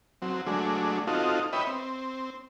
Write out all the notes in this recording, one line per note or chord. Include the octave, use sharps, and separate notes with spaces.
F#3 C4
F#3 G#3 A3 D4
C4 D#4 F4 F#4 A4
B4 C#5 D#5 E5 G5 B5
C4